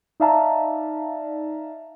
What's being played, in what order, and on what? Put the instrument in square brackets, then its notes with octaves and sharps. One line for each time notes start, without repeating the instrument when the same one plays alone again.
[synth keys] D#4 D5 E5 F5 A5 A#5